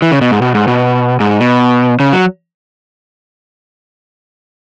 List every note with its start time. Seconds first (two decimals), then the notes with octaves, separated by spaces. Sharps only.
0.02 E3
0.12 C#3
0.21 B2
0.31 G#2
0.42 B2
0.55 G#2
0.67 B2
1.20 G#2
1.40 B2
2.00 C#3
2.13 F#3